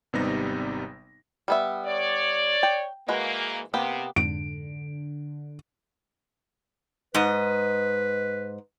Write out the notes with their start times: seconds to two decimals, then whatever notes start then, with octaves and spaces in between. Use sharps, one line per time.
0.13 G#1 C3 G3 B3 D#4 A#6
1.48 G3 B3 E5
1.86 C#5 D5
2.63 G5
3.08 G#2 E3 G#3 A#3 F#4 B4
3.74 C3 A#3 B3 G4
4.16 F2 G#2 D3 D7
7.15 G#2 B4 D#5